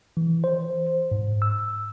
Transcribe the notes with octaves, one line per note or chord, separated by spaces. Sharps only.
E3
C5
G#2
E6